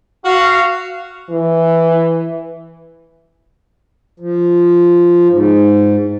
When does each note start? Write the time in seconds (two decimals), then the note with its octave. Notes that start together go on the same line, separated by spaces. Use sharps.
0.25 F#4 F5
1.30 E3
4.20 F3
5.30 G#2